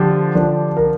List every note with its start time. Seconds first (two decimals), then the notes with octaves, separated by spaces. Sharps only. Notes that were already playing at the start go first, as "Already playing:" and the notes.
Already playing: D3 F3 D4 G4
0.35 D3 F3 D4
0.77 A#4